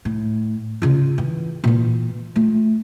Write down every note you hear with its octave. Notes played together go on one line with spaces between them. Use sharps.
A2
C#3 F4
E3
A#2 E3
A3 F4